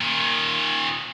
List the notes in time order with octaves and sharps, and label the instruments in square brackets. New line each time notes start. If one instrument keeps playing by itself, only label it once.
[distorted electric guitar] A#2 D#3